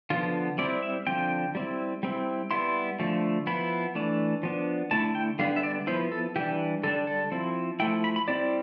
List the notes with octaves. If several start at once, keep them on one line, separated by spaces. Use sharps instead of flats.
D3 F3 B3 F4
G3 C4 E4 D5
E5
D3 F3 C4 G5
G3 C4 E4
G3 C4 E4
G3 B3 E4 C6
D3 F3 A3
F3 B3 E4 B5
E3 A3 D4
F3 B3 D4
D3 A3 E4 A5
G5
D3 G3 B3 D4 F5
E5
D5
F3 B3 E4 C5
A4
E3 G3 D4 G4
D3 G3 D4 A4
A4
F3 C4 E4
F3 A3 E4 G5
B5
B5
G3 C4 E4 D5